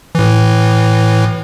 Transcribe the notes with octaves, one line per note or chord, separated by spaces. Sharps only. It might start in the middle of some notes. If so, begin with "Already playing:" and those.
A2 E3